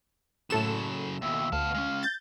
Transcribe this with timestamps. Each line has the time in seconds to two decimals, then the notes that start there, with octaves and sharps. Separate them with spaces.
0.50 A2 C#3 F#3 A4 E7
1.22 D#2 B2 E5
1.52 D2 B3 F5 A5
1.74 G#3 C#4
2.03 G6 A6